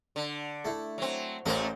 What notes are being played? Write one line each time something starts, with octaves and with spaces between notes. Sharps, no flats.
D3
A3 E4
F#3 C4
A1 A3 A#3 A#4 C5